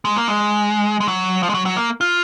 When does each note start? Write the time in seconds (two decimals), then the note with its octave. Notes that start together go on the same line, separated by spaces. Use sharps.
0.05 G#3
0.16 A#3
0.28 G#3
1.00 G#3
1.08 F#3
1.43 F3
1.49 G#3
1.54 F#3
1.66 F#3
1.77 A#3
2.01 F4